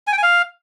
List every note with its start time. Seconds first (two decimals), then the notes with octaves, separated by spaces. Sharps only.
0.07 G#5
0.12 G5
0.18 G#5
0.23 F5